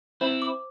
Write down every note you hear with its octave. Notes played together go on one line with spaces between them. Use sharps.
C4 E4 C5
D6